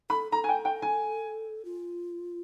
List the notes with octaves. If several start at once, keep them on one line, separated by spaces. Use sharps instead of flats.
A4 B5
A4 A#5
G#5
G5
G5
G#5
F4